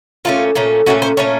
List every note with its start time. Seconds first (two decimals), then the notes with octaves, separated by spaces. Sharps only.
0.25 A#2 A3 C#4 F4
0.55 A#2 A3 C#4
0.86 A#2 A3 C#4 F#4
1.02 C5
1.17 A#2 A3 C#4 C#5